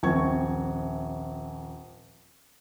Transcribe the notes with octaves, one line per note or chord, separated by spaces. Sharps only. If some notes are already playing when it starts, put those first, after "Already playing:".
D#1 A#1 C4 C#6 G#6